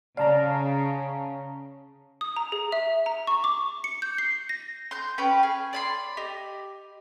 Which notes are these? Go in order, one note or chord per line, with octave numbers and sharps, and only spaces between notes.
C#3 D5 F5 A5 A#5
D#6
A#5
G#4
E5
A#5
C#6
D6
C#7
G6
C7
A#6
C6 G6
C#4 B4 G5
G#4
D5 B5 C6
G4 D#5